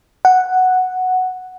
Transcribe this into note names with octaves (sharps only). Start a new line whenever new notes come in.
F#5